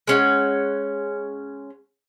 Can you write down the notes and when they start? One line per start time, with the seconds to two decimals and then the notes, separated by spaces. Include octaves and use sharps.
0.07 G#3 C#4 F#5